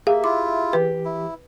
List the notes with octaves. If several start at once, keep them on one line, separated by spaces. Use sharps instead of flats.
A#3 G4 G#4 E5 F5
E4 F4 D6
E3 G4 B4
E4